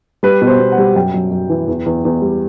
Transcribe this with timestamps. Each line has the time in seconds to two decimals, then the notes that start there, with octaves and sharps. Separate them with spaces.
0.23 G3 B4
0.41 B2
0.47 C5
0.59 B2
0.72 F#5
0.78 G3
0.95 F#2 G5
1.14 F#2
1.31 F#2
1.50 E3
1.68 E2
1.86 E2
2.05 E2
2.22 G3